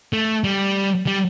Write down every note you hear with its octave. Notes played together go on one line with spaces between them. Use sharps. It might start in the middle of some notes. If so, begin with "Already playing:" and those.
A3
G3
G3